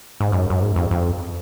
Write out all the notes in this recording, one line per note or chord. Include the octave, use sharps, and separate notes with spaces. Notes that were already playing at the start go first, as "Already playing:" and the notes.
G#2
F#2
F#2
G#2
F2
F2